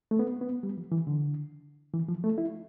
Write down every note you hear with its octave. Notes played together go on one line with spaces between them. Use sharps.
A3
B3
B3
G3
F3
E3
D3
E3
F3
A3
E4